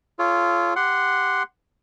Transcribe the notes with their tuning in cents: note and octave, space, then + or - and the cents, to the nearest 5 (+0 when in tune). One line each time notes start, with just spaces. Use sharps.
F4 -15 A4 -35 C#5 +0
G4 +0 F#5 +0 C6 -10